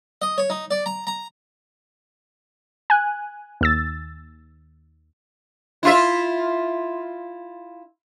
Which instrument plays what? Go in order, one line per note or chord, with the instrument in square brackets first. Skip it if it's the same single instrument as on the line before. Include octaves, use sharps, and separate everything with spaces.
[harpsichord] D#5
C#5
D#4
D5
A#5
A#5
[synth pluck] G#5 F#6
D#2 E6 A6
[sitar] E4 F4 E5